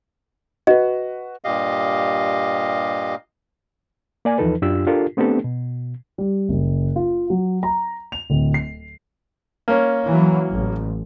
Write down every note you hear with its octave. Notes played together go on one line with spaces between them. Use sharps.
F#4 B4 D#5
G2 A#2 G4 D#5 F5
A#3 D5 G#5
D#2 E3 F3 D#4 A4 B4
F#2 D4 F4 G4 E6
D4 F4 G4 A4 A#4
A3 B3 C4 D4 G4 A4
B2
G3
F#1
F4
F#3
A#5
F7
D1
C7
A#3 C#4
E3 F#3
A1